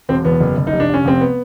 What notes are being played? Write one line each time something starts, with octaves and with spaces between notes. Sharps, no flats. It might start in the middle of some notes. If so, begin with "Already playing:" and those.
E1 C4
E2 B3
F#1
F#1
D#4
F1
D4
F1 C#4
F1 C4
B3